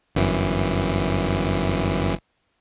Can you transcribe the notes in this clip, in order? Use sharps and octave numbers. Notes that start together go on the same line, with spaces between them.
G1 F#2 E3